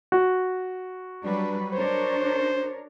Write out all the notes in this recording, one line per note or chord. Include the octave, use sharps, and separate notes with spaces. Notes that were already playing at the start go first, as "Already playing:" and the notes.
F#4
F#3 G3 D4 B4
D4 A#4 C5 C#5